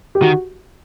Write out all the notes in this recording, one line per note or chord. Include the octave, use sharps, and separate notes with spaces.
G4
D#3 F#4